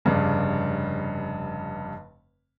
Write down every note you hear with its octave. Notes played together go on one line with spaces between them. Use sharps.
F1 G2 C#3 D4